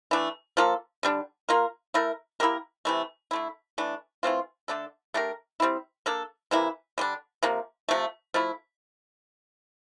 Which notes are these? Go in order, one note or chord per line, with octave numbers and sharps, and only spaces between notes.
E3 A3 D4
F3 A#3 F4 A4
D3 G3 D4
A#3 F4 A#4
A3 E4 A#4
A#3 E4 G4 A#4
C3 E3 A3
D3 A3 E4
E3 A3 D4
E3 A3 C4 F4
D3 A3 D4 A4
A3 D4 G4 A#4
G3 C4 E4
A#3 D4 A4
C3 E3 A#3 E4
D3 G3 D4
C3 F3 A#3
C3 F3 A3
F3 A3 E4